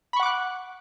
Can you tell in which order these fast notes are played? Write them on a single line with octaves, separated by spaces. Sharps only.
B5 C#6 F#5 D6 F#6